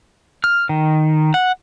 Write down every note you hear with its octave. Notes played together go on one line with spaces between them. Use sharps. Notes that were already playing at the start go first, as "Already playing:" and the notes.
F6
D#3
F#5